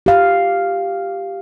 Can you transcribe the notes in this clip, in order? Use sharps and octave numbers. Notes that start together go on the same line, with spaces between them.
G4 F5